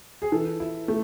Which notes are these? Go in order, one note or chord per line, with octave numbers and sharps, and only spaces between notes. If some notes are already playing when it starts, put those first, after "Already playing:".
G#4
E3 A4
E4
A3